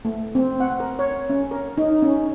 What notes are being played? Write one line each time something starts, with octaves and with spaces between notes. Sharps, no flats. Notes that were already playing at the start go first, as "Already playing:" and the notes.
A3
C4
F#5
A#4
C#5
C#4
A#4
D#4
C#4